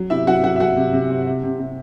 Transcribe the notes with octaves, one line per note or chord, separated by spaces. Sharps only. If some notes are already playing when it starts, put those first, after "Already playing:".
Already playing: F#3
C3 E4 E5
F#3 F#4 F#5
F#3 F#4 F#5
E5
F#3 F#4 F#5
C3
C3
C3
C3
C3
C3